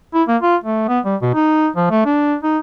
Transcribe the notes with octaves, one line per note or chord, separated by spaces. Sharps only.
E4
A#3
F4
A3
B3
G3
B2
D#4
F3
A3
D4
D#4